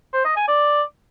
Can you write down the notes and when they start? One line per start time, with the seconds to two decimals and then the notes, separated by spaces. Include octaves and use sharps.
0.13 C5
0.25 D#5
0.36 G#5
0.48 D5